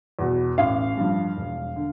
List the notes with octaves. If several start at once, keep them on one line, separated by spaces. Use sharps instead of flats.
E2 B2
A1 F5
G2 F3
E1
D3